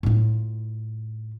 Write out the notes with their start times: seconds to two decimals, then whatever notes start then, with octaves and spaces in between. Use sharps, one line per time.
0.03 A2 F4